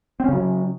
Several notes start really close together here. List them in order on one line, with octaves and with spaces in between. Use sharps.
C4 C#4 C#3 F#3